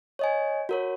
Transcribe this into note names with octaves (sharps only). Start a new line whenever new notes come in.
C#5 D#5 G#5
F#4 A#4 C#5